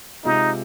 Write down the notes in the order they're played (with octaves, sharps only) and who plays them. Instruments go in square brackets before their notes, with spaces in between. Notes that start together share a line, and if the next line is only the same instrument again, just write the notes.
[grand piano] C3 G#3 F4 [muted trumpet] D#4